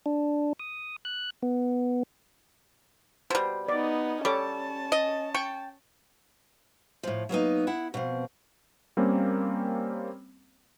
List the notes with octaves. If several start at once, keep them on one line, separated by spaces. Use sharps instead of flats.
D4
D#6
F#6
B3
B2 G3 C5
B3 D#4 D5
G3 C#4 A4 C#5 A5 D6
D#5
G5 C#6
A2 F3
F#3 A#3 B3 D#4
E4 F#5
B2 F3 C4
G3 A#3 C4 C#4